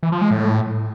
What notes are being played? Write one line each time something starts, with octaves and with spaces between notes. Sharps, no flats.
E3
F3
G#3
A2